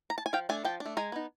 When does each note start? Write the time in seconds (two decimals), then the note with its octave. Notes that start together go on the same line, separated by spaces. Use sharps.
0.10 A#5
0.18 A5
0.26 G#5
0.33 F3 F5 G5
0.49 A3 D4 G#5
0.65 F3 G5 A5
0.80 D4
0.86 A3
0.97 G#3 G#5 A#5
1.12 B3 D#4